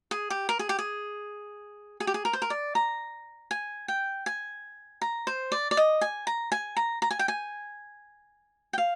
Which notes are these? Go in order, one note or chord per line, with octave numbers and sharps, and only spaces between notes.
G#4
G4
A#4
G#4
G4
G#4
G#4
G4
G#4
A#4
C5
A#4
D5
A#5
G#5
G5
G#5
A#5
C5
D5
D5
D#5
G#5
A#5
G#5
A#5
A#5
G#5
G5
G#5
G5
F5